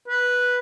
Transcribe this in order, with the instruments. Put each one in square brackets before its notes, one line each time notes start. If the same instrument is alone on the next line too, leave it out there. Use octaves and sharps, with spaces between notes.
[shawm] B4